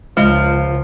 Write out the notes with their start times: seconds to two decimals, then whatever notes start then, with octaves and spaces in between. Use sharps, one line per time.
0.17 C#2 C#3 F3 G#3 D#5